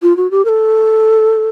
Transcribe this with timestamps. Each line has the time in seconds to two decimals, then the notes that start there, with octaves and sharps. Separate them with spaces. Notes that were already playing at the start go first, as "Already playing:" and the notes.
0.02 F4
0.17 F#4
0.31 G4
0.45 A#4
0.48 A4